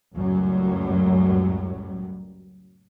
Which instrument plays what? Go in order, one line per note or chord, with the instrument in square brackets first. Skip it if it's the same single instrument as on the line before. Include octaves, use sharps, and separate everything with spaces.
[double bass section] C#2 F#2 A2 F#3 G3